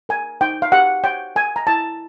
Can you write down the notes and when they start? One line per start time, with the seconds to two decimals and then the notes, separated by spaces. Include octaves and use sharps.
0.09 A#4 G#5
0.41 D#4 G5
0.62 F5
0.72 G4 F#5
1.04 C#5 G5
1.36 A#4 G#5
1.56 A#5
1.67 E4 A5